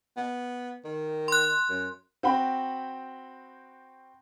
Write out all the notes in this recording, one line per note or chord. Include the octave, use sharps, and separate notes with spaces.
B3
D#3
C6 F#6
F#2
C4 F#4 F#5 G5 B5